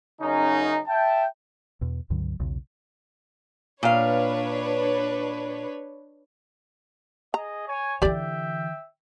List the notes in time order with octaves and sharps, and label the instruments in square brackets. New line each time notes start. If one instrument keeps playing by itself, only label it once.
[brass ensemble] F#2 C#3 C#4 D#4
E5 G5 A5
[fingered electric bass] E2 B2
C#2 G2 D3 F#3
B1 E2 C#3
[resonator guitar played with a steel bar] A#2 F5 [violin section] D4 B4 C#5
[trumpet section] G#4 D#5 [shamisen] A#5
[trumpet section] C#5 G#5
[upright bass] D3 E3 [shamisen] G4 D5 [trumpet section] E5 G5